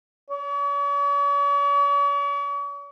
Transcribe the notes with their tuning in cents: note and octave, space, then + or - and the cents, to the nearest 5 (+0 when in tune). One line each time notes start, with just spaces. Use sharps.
C#5 +45